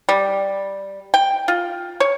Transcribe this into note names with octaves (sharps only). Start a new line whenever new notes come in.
G3
G5
F4
C#5